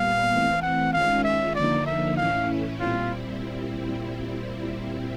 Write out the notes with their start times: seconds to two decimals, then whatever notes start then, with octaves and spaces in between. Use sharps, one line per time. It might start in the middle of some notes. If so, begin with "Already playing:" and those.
Already playing: A#2 G3 B3 F5
0.30 E3 A3 C4
0.62 F#5
0.93 D#3 G#3 C#4 F4 F5
1.24 E5
1.55 D3 F3 A#3 D#4 D5
1.86 E5
2.17 A2 E3 A3 C#4 E4 F5
2.80 A#2 G3 C4 E4 F4